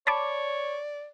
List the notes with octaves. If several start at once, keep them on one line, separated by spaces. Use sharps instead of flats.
C#5 D5 A5 B5 D6